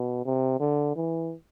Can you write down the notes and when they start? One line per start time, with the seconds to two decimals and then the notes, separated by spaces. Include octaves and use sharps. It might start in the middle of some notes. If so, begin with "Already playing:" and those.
Already playing: B2
0.25 C3
0.60 D3
0.96 E3